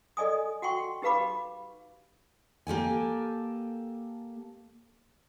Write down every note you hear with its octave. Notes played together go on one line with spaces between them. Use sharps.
A4 D5 D#5 G#5 D#6
F#4 F#5 G5 C6 C#6
D#4 G4 B4 F5 B5 D6
A#3 G4 A4 G#5